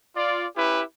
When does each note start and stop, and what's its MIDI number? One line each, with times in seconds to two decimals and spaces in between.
0.16 0.46 65
0.16 0.46 74
0.56 0.82 61
0.56 0.82 64
0.56 0.82 67
0.56 0.82 71